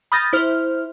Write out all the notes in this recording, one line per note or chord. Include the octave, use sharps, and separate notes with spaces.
B5 D#6 F6 G6 A6 A#6
E4 C5 F6